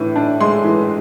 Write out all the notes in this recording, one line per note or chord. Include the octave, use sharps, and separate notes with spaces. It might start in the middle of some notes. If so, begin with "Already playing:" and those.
Already playing: A2 E3 D4
D4
G#3 C6
E3